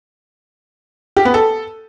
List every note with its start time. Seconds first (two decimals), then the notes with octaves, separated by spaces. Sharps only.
1.16 G4
1.25 B3
1.34 A4